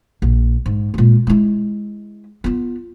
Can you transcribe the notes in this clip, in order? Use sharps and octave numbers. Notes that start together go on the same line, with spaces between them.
A#1
G#2
A#2 G#3
G#3 E4
B3 F4